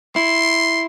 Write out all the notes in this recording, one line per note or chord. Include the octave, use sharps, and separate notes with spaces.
E4 C6